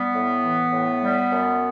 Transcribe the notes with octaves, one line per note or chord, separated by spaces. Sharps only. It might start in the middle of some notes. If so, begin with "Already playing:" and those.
Already playing: G3 B3
A2
E3
A2
G3
F#2